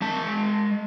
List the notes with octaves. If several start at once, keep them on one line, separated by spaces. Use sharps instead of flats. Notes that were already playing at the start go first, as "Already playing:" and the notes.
G#3 A5